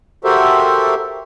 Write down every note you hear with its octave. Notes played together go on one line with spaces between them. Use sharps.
F#4 G4 A4 A#4 C5 E5